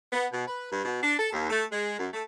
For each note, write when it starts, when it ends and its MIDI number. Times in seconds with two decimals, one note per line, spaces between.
0.12 0.26 59
0.32 0.46 47
0.48 0.69 71
0.71 0.84 43
0.85 0.99 47
1.03 1.13 62
1.19 1.31 69
1.33 1.48 39
1.50 1.63 57
1.71 1.99 56
1.99 2.07 42
2.13 2.23 57